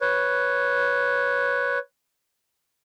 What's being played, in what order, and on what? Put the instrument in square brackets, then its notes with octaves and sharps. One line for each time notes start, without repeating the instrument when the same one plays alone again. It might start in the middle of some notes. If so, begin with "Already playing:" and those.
[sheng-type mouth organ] B4 C#5